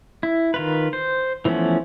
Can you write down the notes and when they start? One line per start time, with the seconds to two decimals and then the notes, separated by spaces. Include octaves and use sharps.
0.23 E4
0.54 D#3 F4 B4
0.93 C5
1.45 E3 F3 A3 B3 C#4